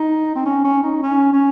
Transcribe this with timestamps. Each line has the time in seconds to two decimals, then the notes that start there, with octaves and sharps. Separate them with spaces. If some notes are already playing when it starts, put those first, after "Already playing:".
Already playing: D#4
0.36 C4
0.45 C#4
0.64 C#4
0.83 D#4
1.03 C#4
1.33 C#4